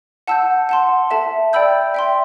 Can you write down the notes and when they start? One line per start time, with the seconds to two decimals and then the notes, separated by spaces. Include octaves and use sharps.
0.27 F#5 A5 E6 G6
0.69 F#5 A5 C6
1.11 A4 E5 A5
1.53 D5 G5 B5 E6 G6
1.94 E5 G5 C6